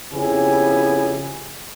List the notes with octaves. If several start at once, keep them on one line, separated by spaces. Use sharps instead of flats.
F2 C#3 B3 E4 G4 G#5